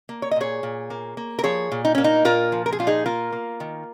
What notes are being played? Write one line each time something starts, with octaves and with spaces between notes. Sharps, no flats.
A#3
C#5
D#5
A#2 G#4 C#5
A#2
A#3
A#3
A#4
F3 G#4 C#5
A#2
D#4
A#3 C#4
D#4
A#2 F4 A#4
F3
A#4
G#4
A#2 F4
D#4 G#4
A#3 F4 A#4
A#3
D#3